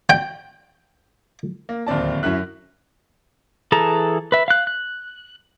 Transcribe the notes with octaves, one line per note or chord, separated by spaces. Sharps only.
G5
A#3
D1 D#2 C4 D5 A5
F#2 F#3 E4 F#6
E3 G#4 A4 A5 A#5
B4 E5
F5 F#6
F#6